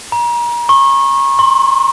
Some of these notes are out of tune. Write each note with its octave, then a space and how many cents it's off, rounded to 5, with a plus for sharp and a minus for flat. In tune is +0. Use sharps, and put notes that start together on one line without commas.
A#5 +35
C#6 -30
C6 +30